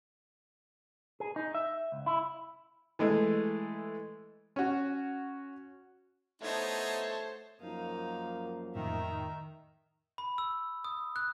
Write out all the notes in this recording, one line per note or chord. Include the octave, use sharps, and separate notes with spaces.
G#4
D#4
E5
C#2
E4
E3 G#3 A3
C#4 F#4
A3 B3 D#4 E4 C5 C#5 A5
F#2 F3 A#3 D#4 F5
F2 A2 D#3 E5 A#5
B5
E6
D#6
F#6